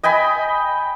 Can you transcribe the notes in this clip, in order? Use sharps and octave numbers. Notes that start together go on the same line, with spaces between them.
D#5 G5 G#5 B5